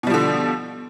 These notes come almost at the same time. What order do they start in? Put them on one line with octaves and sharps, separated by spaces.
B2 G3 F3 D3